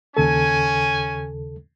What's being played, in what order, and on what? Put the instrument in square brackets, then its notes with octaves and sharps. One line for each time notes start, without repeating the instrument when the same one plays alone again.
[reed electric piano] D#2 C#3 A4 [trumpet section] C#4 G#5